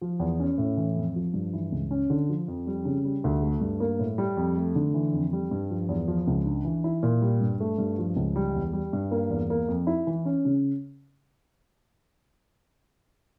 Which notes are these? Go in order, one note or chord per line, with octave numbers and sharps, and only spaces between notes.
F3
E2
C#4
A2
E3
F2
F3
G2
E3
C#2
C#4
D3
F3
F2
G3
C#3
G3
D2
A3
G2
A#3
A2
G3
F2
A3
D3
E3
F2
G3
G2
F3
E2
F3
C#2
D4
E3
E4
A#2
G3
G2
A3
G2
F3
C#2
G3
E2
G3
G2
A#3
E2
A#3
F2
E4
E3
C#4
C#3